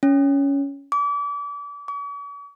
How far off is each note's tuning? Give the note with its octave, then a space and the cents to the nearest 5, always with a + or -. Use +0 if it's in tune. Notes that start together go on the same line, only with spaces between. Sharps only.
C#4 +10
D6 -35
C#6 +45